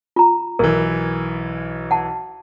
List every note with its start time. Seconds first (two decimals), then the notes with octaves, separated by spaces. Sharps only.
0.16 F4 A#5
0.59 B1 E3 A#4
1.91 F#5 A5